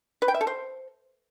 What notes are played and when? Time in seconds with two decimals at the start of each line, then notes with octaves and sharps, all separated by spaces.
0.22 B4
0.28 G5
0.34 E5
0.41 A4
0.47 C5